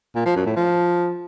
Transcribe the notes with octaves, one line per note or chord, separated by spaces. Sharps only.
A#2
F3
F#2
A2
F3